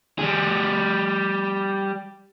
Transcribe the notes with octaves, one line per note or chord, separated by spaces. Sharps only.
G3 G#4